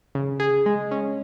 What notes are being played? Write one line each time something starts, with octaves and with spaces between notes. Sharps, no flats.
C#3
G#4
G#3
C#4